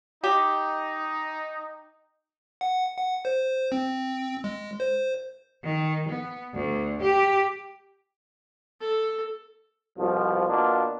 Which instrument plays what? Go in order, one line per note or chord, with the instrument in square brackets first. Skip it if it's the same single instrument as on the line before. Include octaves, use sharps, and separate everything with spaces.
[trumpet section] D#4 [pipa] G4
[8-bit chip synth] F#5
F#5
C5
C4
G#3
C5
[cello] D#3
B3
D2
G4
[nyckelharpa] A4
[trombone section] C2 B2 F3
B2 A#3 D4 F4